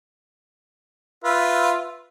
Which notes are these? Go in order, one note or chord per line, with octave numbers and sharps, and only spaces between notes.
F4 B4 E5